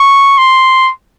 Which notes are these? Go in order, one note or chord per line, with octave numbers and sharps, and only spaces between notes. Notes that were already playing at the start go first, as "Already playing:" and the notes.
Already playing: C#6
C6